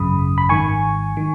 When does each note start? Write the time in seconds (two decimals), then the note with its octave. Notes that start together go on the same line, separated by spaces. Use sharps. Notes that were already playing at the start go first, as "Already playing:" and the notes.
Already playing: G#1 F#2 C#3 B5 D#6
0.38 B5
0.49 G#1 G#2 D#3 G#5 C#6
1.17 D#3